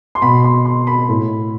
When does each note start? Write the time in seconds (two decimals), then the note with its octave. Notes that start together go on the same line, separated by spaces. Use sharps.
0.15 C6
0.22 B2 B5
0.44 C6
0.65 C6
0.87 B5
1.09 A2